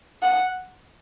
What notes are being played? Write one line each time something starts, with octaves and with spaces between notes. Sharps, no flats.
F#5